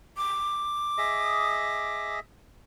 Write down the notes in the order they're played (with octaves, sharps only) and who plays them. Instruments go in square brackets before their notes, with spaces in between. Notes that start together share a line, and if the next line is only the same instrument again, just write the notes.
[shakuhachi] D6
[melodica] G#4 D#5 E5